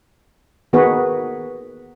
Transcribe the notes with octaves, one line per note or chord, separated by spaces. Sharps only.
D#3 B3 F#4 G#4 B4